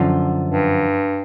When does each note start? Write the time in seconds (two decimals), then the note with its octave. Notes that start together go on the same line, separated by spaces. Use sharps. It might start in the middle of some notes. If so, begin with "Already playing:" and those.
Already playing: F#2 D3 F3
0.49 G2